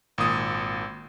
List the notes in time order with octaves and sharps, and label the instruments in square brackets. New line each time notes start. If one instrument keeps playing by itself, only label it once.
[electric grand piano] G#1 A#2 D#6